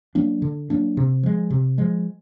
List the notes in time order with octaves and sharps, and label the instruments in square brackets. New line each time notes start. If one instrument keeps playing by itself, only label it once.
[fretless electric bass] F#3 A#3 D4
D3
F#3 A#3 D4
C3
F3 G#3
C3
F3 G#3